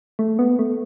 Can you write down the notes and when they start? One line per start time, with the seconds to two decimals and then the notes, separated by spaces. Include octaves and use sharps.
0.19 A3
0.39 B3
0.59 A3